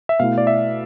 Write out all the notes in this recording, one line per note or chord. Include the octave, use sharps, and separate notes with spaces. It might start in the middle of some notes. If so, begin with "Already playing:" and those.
E5
B2 A3 E4 F5
D5
E5